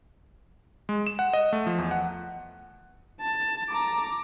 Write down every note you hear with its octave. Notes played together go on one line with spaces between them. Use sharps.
G#3
E7
F#5
D#5
A3
F3
E2
F#5
A5
A#5 D6